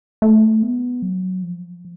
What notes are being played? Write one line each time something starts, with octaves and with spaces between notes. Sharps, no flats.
A3
B3
F#3
F3